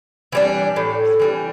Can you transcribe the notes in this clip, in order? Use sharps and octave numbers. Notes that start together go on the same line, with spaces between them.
E3 G3 D4
A2
E3 G3 D4